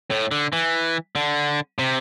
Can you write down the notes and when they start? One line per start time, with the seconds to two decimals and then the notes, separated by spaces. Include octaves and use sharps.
0.11 A2
0.32 D3
0.53 E3
1.15 D3
1.79 C3